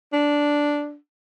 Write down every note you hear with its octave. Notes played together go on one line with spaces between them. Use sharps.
D4